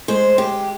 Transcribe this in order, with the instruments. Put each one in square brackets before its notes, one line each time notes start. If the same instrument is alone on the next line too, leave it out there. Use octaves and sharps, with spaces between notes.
[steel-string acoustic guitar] G#3 C5
G4